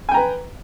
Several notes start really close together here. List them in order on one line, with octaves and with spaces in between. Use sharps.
G#5 G5 A#5 B4